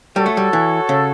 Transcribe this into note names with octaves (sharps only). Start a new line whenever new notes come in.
G3 F#4 A4 C#5
A3
G3
E3
C#3